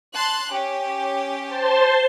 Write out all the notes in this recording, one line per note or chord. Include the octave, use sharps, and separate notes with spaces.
A5 C6 F#6
C#4 G4
C5 A5 C6